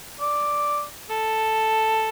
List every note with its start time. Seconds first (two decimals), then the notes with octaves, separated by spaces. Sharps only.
0.20 D5
1.10 A4